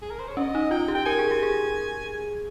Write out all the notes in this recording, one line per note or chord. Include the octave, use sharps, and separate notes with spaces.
G#4
A#4
C5
C#5
C#4 D#5
D#4
F4 G5
G4
G5
A#4 G#5
G#4
G4
G#4